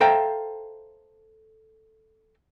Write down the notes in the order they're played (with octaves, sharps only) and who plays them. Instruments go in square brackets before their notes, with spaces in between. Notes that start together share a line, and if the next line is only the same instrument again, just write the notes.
[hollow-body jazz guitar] A4 C5 E5 F5 G5 A#5